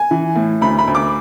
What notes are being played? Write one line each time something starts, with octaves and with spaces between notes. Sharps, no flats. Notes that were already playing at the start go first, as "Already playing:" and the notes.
Already playing: G#5
E3
A2
D2 B5
B5
D2
D6